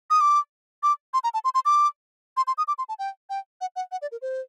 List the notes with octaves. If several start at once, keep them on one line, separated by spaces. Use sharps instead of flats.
D#6
D6
D6
C6
A#5
A5
C6
C6
D6
C6
C6
D#6
D6
C6
A5
G5
G5
F#5
F#5
F#5
D5
A#4
C5